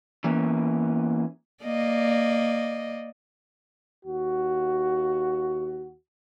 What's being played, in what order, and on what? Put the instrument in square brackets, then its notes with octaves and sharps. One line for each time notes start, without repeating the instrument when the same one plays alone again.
[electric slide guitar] E3 A#3 B3 C#4
[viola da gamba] A#3 D5 D#5
[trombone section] D#2 F#4